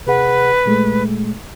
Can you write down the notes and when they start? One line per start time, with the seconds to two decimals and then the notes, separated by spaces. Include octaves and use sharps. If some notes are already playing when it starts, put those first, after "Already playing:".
0.07 C3 G#4 B4 F#5
0.66 A#2 G#3 A3